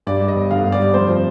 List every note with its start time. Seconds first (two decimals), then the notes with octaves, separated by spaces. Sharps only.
0.07 G2 D5
0.21 G3
0.28 D#5
0.36 G1
0.51 D3 F5
0.65 G2
0.72 D5
0.80 G3
0.94 F2 C5
1.09 F3